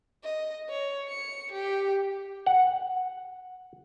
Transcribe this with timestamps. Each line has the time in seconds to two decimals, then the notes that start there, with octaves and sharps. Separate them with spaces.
0.24 D#5
0.69 C#5
1.08 C#7
1.52 G4
2.46 F#5